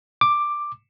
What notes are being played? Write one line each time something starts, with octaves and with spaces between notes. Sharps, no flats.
D6